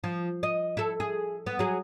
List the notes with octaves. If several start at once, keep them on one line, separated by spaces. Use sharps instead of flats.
F3
D#5
E4 A4
G#4
B3
F#3 G#4